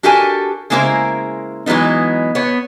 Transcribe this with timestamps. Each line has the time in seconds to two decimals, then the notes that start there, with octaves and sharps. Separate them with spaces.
0.03 D4 F#4 G4 A4 A#4 G#5
0.70 C#3 G#3 A#3 E4 A#4 C5
1.66 E3 F#3 G#3 B3 D#4
2.35 B3 C#5